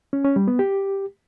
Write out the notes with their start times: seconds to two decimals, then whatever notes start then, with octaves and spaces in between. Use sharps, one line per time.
0.13 C#4
0.25 C#4
0.36 G3
0.48 B3
0.59 G4